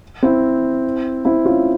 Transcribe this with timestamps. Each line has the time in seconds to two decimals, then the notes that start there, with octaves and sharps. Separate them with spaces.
0.23 C4 E4
1.25 C4 E4
1.45 C#4 F4